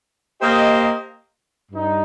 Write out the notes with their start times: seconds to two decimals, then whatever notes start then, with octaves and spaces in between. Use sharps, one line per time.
0.41 A#3 G4 C5 D#5
1.72 G2 G3 D#4